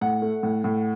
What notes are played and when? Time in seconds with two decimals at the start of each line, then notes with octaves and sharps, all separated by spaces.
0.01 A2 F#5
0.22 A3
0.43 A2
0.64 A2